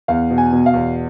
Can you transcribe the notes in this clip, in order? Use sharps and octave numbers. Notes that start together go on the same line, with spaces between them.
E2 F5
B2
G#5
B2
F5
E2